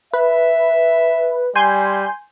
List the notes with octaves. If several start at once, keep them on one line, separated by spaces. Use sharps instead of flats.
B4 E5
G3 G#5 C6 G6